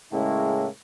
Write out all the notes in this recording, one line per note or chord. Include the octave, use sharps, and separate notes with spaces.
A2 C#3 G#3 A#3 C#4 E4